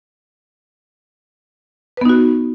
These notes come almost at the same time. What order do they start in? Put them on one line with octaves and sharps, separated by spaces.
B4 B3 D#4 F#4